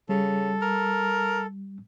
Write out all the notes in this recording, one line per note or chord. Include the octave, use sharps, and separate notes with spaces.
C#3 G3 A4
A#4